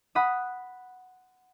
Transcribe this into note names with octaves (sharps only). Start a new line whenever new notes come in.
F#5 B5 D#6